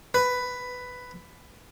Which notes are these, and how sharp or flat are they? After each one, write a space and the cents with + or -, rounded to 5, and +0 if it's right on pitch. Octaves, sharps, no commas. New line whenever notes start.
B4 +10